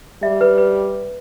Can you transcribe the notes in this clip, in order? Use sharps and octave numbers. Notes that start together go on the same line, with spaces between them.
G3 E5
B4
B4